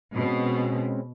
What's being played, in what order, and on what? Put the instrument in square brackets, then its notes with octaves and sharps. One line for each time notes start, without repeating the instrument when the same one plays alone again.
[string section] B2 [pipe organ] G#3 C4 C#4